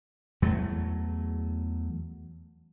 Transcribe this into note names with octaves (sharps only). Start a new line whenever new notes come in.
E2 F#3 A3